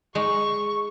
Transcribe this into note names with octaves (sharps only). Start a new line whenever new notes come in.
G#3 D#4 C#6